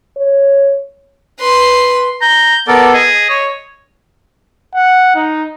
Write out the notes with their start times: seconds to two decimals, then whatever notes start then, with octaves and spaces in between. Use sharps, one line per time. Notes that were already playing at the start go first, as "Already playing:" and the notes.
0.17 C#5
1.40 B4 C6
2.22 A#5 G6
2.68 B3 A4 A#4 D5
2.94 G#4 D#5
3.30 C#5
4.75 F#5
5.16 D#4